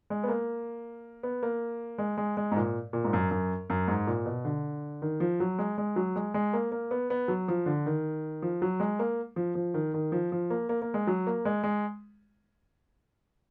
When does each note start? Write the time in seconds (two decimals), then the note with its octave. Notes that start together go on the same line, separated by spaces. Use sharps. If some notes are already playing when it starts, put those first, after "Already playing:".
0.10 G#3
0.24 B3
0.28 A#3
1.23 B3
1.43 A#3
1.98 G#3
2.18 G#3
2.37 G#3
2.52 G#2
2.56 A#2
2.93 A#2
3.04 G#2
3.13 F#2
3.31 F#2
3.70 F#2
3.88 G#2
4.07 A#2
4.26 B2
4.45 D3
5.02 D#3
5.20 F3
5.40 F#3
5.59 G#3
5.78 G#3
5.96 F#3
6.16 G#3
6.34 G#3
6.53 A#3
6.72 A#3
6.91 B3
7.10 B3
7.28 F#3
7.48 F3
7.66 D3
7.86 D#3
8.42 F3
8.62 F#3
8.80 G#3
8.99 A#3
9.36 F3
9.55 F3
9.74 D#3
9.94 D#3
10.12 F3
10.32 F3
10.50 A#3
10.69 A#3
10.82 A#3
10.94 G#3
11.07 F#3
11.27 A#3
11.45 G#3
11.64 G#3